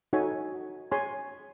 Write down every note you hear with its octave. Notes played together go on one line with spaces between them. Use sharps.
D#4 F#4 A4 C#5 G#5
G#4 C#5 G#5 C6